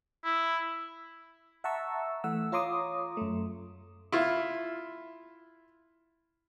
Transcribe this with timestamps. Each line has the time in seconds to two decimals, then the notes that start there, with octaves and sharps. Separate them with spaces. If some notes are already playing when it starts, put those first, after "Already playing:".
0.24 E4
1.64 E5 F#5 A5 A#5 C#6 E6
2.24 E3 A3 F#5 E6
2.52 F4 C#5 A#5 C6 D6 D#6
3.17 F#2 A3
4.12 E4 F4